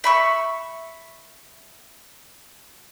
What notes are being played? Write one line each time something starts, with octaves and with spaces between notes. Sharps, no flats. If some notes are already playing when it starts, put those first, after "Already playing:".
E5 B5 C#6